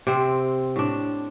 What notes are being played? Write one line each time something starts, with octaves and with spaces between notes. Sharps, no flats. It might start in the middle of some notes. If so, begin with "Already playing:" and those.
C3 C4
A2 D4